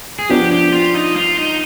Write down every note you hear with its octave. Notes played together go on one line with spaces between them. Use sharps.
G#4
F3 B3 D4 G4
G4
F4
D#4
F4
D#4